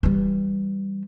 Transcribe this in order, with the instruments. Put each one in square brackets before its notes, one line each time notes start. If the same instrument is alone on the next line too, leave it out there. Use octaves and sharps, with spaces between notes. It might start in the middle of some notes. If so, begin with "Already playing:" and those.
[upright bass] E3 G3